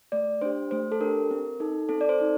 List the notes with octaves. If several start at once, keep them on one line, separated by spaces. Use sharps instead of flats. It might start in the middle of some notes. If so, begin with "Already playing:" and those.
A3 D5
D4 G4 C5
A3 C5
A4
D4 G4 A#4
C4
D#4 A4
C4 A4
D5
C5
D#4 A4